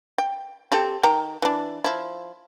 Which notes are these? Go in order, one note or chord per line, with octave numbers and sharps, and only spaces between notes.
G5
C4 G4 A4
D#3 G5 A#5
E3 D4
F3 E4